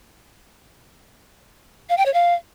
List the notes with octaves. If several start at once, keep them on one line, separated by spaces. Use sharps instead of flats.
F5
G5
C#5
F5